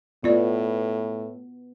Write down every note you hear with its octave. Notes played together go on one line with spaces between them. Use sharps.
A2 B3 F4 D5